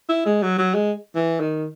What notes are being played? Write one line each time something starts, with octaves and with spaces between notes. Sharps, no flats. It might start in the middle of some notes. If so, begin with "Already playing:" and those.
E4
G#3
F#3
F#3
G#3
E3
D#3